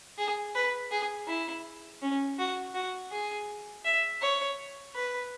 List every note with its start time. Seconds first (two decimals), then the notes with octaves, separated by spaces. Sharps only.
0.18 G#4
0.55 B4
0.91 G#4
1.28 E4
2.02 C#4
2.39 F#4
2.75 F#4
3.11 G#4
3.85 E5
4.22 C#5
4.95 B4